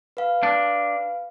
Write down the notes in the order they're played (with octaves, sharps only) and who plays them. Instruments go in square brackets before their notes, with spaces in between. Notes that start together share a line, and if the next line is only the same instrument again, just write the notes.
[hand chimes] B4 F5
[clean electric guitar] D4